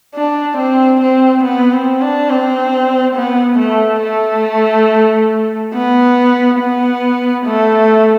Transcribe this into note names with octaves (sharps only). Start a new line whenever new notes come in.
D4
C4
C4
B3
C4
D4
C4
B3
A3
A3
B3
B3
A3